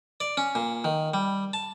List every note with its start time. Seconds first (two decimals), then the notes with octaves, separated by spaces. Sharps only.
0.20 D5
0.37 C#4
0.55 A#2
0.84 D#3
1.14 G3
1.53 A5